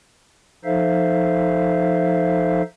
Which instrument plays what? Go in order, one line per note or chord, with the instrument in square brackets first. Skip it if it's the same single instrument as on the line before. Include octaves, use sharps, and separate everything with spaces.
[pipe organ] F3 D#4 A4 C5 E5 F5